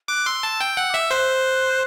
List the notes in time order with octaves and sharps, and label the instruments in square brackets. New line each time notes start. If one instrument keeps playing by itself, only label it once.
[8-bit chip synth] D6 [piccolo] F#6
[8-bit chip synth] C6 [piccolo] E6
[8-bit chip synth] A5
G5
F#5
[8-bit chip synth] E5 [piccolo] D6
[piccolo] E6
[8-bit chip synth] C5 [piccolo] F#6